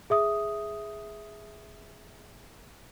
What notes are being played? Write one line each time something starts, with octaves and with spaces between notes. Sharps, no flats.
G#4 E5 D#6